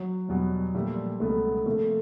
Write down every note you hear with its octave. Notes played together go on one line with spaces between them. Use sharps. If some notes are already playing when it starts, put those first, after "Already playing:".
Already playing: F#3
E2 B2 F#3 G3 B3
A#2 F3 G3 A3
C#2 B2 F#3 A3 B3
C3 F3 A3 A#3